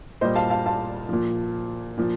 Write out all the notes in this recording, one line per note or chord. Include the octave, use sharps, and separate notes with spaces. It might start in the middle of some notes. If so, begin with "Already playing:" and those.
A#2 G3 C5 D#5
F5 A5
F5 A5
F5 A5
A#2 F3
A#2 F3